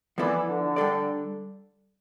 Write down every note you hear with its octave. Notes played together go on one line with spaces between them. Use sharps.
E3 F3 B3 E4 A4 D5
D3
G3 D4 A4 D5